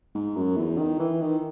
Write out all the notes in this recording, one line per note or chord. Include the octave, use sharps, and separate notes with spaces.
G#2
F#2
E2
D#3
E3
D#3